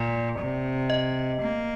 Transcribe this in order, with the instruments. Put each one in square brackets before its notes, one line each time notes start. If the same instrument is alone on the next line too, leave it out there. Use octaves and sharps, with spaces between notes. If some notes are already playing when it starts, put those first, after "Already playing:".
Already playing: [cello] A#2 [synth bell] D5
[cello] C3
[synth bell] D#5
[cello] A#3